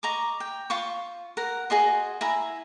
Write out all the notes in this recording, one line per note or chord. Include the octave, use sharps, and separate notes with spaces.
D#5 A#5 C#6 D6
G5
F4 C6 C#6
A#4 F#5
F#4 G#4 D#5 C6
E4 G#5 A#5